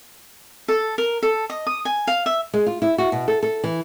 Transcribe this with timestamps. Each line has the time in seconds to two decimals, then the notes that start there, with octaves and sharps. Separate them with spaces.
0.68 A4
0.98 A#4
1.23 A4
1.50 D#5
1.67 D#6
1.85 G#5
2.07 F5
2.26 E5
2.54 G#3
2.66 F4
2.82 E4
2.98 F#4
3.12 B2
3.28 A4
3.43 A4
3.64 E3